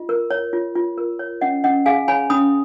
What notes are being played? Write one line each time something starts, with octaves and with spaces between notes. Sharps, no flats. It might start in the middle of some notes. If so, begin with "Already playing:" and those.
Already playing: F4 D#5
A#4
C#5
F4
F4
A#4
C#5
C#4 D#5 F#5
C#4 D#5 F#5
G#4 F5 G#5
C#5 G#5 B5
C#4 B5 D#6